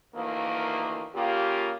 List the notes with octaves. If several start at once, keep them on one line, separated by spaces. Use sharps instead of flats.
D2 D#3 E3 A#3
C#3 A#3 F4 G4